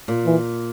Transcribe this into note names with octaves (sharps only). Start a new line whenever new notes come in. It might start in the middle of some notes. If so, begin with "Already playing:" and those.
A#2
E3